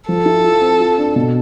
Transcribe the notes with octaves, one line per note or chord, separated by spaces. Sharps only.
F3 A4
E4
F4
C4
F4
D4
B2